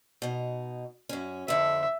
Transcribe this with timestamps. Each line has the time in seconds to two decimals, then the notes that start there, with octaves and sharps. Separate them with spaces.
0.22 B2 D#4
1.09 F#2 C#4
1.48 F2 D3 E5